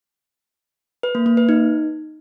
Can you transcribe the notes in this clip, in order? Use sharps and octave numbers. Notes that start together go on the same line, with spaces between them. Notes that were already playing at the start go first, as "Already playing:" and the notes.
B4
A#3
A#3
B4
D#4